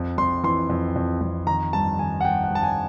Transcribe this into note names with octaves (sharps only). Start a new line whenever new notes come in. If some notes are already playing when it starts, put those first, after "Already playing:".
Already playing: F2
F2 C6
E3 C6
F2
F2
F2
D#3 A#5
G2 A5
D#3 G#5
F#5
G2 G5
F#5
G2 A5
G#5